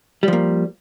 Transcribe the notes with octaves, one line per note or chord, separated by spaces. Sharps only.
F3 G3 A#3